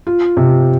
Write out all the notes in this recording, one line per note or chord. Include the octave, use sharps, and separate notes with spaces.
F4
C3